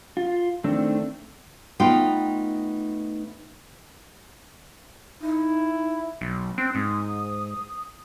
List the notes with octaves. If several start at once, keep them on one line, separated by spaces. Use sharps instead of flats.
F4
D#3 A3 C4 D4
A3 B3 D#4 F4 F5 G5
D#4 E4
B1
C4 F#6
G#2 D#6